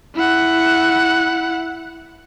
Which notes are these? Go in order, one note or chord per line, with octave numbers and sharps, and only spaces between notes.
E4 F#5